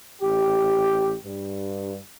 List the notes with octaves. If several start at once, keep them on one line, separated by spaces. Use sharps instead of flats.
A1 G4
G2